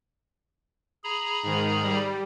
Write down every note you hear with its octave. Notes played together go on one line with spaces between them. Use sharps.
G#4 A#5 B5
G#2 D#3
G3